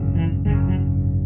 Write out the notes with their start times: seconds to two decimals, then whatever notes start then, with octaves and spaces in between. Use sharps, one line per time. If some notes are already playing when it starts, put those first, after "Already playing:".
Already playing: G#1 F#2 C#3
0.15 E3
0.45 G#1 F#2 C#3 G#3
0.68 F#3